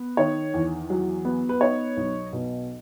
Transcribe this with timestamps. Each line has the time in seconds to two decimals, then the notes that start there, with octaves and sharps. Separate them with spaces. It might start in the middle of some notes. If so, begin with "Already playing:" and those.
Already playing: B3
0.17 D#3 C#5
0.54 E2
0.90 F#3
1.25 B3
1.49 B4
1.61 D#4 C#5
1.97 B1
2.33 B2